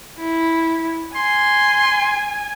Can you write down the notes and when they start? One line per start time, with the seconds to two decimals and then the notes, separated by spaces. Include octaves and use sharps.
0.19 E4
1.15 G#5 C6